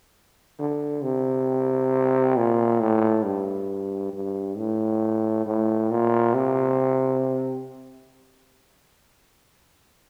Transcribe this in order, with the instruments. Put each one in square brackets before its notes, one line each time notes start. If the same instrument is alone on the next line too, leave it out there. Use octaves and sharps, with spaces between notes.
[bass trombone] D3
C3
A#2
A2
G2
G2
A2
A2
A#2
C3